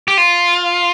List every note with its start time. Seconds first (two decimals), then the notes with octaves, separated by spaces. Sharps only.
0.08 G4
0.18 F4